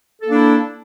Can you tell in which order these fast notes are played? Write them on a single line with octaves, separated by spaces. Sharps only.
A4 A#3 D4 E4